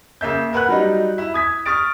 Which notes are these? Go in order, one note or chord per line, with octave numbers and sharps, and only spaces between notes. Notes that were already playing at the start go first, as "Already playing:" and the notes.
C#3 A#3 E5 G6
A#4 B4 F#5 B5 F#6
F#3 G3 D#4
E4
D#6 G#6 B6
C#6 D#6 F6 A6 D7